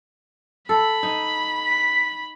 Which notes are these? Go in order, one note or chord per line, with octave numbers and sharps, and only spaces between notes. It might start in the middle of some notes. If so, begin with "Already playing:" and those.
A4 B5
D#4
B6